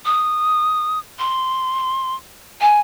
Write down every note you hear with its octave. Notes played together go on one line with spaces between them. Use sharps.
D#6
C6
G#5